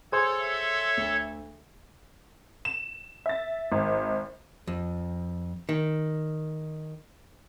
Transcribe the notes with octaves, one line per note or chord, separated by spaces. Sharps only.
G#4 A4 C5 C#5 G#6
E5
D2
E7
E5 A6
G#1
F2
D#3